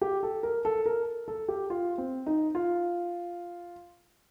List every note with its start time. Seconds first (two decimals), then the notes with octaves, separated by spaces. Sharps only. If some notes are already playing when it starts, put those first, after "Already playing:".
0.01 G4
0.23 A4
0.43 A#4
0.65 A4
0.86 A#4
1.28 A4
1.48 G4
1.70 F4
1.98 C4
2.26 D#4
2.55 F4